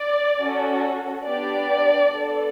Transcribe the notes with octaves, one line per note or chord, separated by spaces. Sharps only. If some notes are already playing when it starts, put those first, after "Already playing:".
Already playing: D5
C#4 F#4 A4
B3 D4 G4 D5
B3 D4 A4